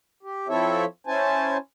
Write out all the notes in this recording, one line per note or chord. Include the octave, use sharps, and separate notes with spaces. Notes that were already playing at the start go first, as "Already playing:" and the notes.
G4
F3 C4 E4 A4 C#5 E5
C#4 E4 C5 G#5 A5